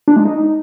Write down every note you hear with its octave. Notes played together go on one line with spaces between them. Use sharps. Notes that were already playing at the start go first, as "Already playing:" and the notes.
D4
G#3
D#4